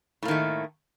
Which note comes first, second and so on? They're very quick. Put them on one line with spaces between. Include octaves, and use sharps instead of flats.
A2 A#3 D#3 A3